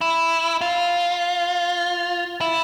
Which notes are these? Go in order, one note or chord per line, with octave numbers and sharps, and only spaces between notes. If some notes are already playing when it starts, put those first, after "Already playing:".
E4
F4
E4